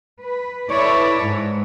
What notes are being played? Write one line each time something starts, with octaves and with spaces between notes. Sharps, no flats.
B4
E4 A4 B4 C#5 D5
G#2